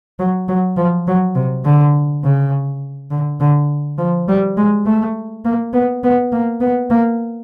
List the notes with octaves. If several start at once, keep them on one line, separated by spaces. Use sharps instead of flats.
F#3
F#3
F3
F#3
C3
D3
C#3
D3
D3
F3
G3
G#3
A3
A#3
B3
B3
A#3
B3
A#3